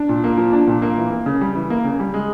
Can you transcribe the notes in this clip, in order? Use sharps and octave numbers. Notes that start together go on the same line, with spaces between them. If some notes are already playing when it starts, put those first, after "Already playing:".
Already playing: D4
A#2
A#3
F3
D4
A#2
A#3
E3
A#3
C#3
G3
E3
A#3
C#3
G3
G#3